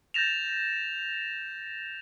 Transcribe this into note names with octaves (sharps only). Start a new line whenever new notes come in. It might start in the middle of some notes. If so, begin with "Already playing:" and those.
G6 A6 A#6 E7 F7